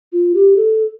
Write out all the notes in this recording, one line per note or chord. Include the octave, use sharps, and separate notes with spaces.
F4
G4
A4